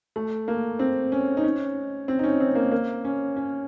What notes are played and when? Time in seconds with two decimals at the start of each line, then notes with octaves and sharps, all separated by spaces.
0.16 A3
0.48 A#3
0.79 C4
1.12 C#4
1.37 D#4
1.44 C#4
2.08 C4
2.19 D#4
2.23 C#4
2.40 C4
2.55 A#3
2.71 A#3
3.05 C#4
3.36 C#4